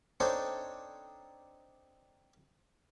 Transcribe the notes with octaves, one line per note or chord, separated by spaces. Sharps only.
C4 D4 D#4 A4 C5 C#5